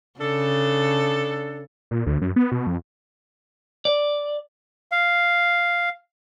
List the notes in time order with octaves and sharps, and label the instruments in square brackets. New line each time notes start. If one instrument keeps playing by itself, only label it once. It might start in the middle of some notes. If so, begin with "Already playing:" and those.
[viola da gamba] C#3 [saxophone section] D4 A4
[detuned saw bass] A#2
D2
F#2
B3
B2
F2
[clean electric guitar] D5
[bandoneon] F5